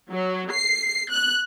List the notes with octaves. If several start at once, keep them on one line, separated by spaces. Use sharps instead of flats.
F#3
C7
F#6